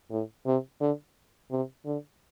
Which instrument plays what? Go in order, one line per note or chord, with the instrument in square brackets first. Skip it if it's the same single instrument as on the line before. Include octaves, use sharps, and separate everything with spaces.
[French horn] A2
C3
D3
C3
D3